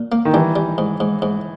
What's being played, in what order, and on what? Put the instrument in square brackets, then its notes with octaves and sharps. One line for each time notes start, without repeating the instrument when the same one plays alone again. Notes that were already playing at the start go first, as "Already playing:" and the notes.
Already playing: [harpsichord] A#2
A#3
[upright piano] D#3
[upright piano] E3 [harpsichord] G3
[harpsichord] G3
G#2
G#2
G#2